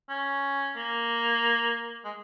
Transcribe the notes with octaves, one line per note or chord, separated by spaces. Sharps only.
C#4
A#3
G#3